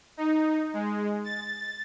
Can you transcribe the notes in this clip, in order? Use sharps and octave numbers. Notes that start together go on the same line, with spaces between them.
D#4
G#3
A6